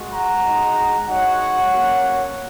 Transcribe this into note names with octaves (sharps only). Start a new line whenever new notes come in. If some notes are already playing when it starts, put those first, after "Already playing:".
Already playing: G#3 F#4
F#5 A#5
G#3 D#4 F#4
G#3 D#4 F#4 C#5 F#5
A#3 C#4 F#4